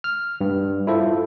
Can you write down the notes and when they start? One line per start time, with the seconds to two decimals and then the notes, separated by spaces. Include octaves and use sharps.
0.04 F6
0.41 G2
0.87 E4 F4 A4 C5